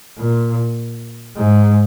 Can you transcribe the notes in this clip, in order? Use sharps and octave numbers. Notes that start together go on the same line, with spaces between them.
A#2
G#2